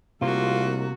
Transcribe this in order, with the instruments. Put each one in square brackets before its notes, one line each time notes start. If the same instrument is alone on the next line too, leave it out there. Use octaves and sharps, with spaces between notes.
[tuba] C2 [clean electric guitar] C3 A#3 [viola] A3 F#4 [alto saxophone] F4